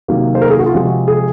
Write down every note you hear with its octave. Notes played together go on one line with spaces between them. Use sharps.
C3 D#3 F#3 A#3
C5
A#4
G#4
F#4
F4
C3 F3 G#3 F#4
G#4